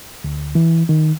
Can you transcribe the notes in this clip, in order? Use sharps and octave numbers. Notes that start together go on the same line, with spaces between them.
D2
E3
D#3